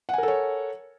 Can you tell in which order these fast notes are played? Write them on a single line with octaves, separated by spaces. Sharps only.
F#5 G#5 A#4 A4 C#5